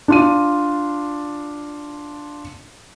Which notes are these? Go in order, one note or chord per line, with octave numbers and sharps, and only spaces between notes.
D4 F4 D#7